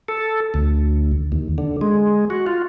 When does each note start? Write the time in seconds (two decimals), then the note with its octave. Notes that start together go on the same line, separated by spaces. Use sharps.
0.08 A4
0.54 D2
1.32 D#2
1.58 D3
1.81 G#3
2.30 F#4
2.47 F4